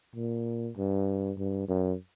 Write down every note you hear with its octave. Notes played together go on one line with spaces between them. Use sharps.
A#2
G2
G2
F#2